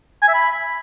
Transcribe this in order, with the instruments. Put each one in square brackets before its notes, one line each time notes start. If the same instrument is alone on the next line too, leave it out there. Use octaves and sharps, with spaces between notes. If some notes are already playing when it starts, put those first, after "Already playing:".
[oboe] G#5
E5
B5